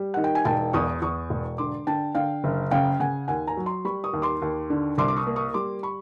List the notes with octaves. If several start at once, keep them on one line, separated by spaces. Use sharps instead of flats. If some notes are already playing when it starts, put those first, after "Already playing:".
Already playing: G3
D#3 F#5
G5
G#5
E1 G5 A5
E2 C#6 D#6
E2 C#6 D#6
E1
D3 C6 D6
D3 G5 A5
D3 F5 G5
F#1
C#3 F5 G5
C#3 F#5 G#5
D#2 F#5 G#5
G#5 A#5
F#3
A#5 C6
G3 B5 C#6
C#6 D#6
D#2
C6 D6
D#2
D3
C2 C6 D6
D6
C#6 D#6
A#3
C#6 D#6
G3 C6 D6
B5 C#6